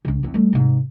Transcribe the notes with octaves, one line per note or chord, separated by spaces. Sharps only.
C#2 C#3
E2 C4
G3 A3
G#2 C3